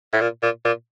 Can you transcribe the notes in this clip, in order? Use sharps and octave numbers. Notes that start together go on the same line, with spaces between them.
A2
A#2
A#2
A#2